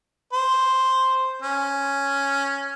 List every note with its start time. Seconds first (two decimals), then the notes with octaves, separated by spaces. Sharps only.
0.33 C5
1.42 C#4